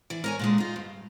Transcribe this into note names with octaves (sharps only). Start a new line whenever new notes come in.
E3 D5
A#4 C#5 G#5
A#2 D3 G#3
D#4 F4
G2